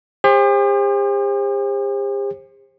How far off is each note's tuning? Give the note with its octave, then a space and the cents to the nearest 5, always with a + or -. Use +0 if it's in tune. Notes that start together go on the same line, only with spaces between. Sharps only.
G4 +45 C5 +30